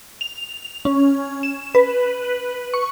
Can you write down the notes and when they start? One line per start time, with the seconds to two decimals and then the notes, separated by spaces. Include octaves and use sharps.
0.21 F7
0.85 C#4
1.43 E7
1.75 B4
2.74 C#6